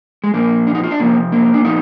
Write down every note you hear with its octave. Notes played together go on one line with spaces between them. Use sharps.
G#3
A#2 F3 A#3
D4
D#4
F4
D4
C3 F3 A#3
A#3
D4
A#2 F3 D#4